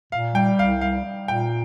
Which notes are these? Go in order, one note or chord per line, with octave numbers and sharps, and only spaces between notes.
A#2 F5
G3 G5
C2 F5
G3 F5
G3
A#2 G5